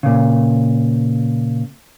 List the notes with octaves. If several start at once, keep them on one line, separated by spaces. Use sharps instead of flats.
A#2 C#3